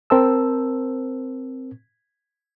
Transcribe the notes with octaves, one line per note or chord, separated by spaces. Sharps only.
C4 A#4 C5 A5 E6